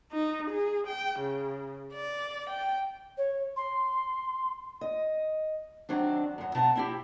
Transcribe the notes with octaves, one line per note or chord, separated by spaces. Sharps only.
D#4
G#4
G5
C#3
D5
G5
C#5
C6
D#5
D#3 F#3 C4 D4
F#2 F#3
B2 B3 A5 A#5
C4 E4 G4